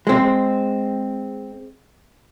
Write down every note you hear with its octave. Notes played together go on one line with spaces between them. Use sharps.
G#3 C4